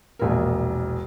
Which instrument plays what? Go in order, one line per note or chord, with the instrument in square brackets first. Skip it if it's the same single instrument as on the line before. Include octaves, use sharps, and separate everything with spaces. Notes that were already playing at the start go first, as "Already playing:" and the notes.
[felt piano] E1 A#1 A#4